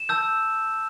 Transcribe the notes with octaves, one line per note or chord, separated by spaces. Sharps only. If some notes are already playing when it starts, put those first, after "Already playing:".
Already playing: E7
A5 E6 G6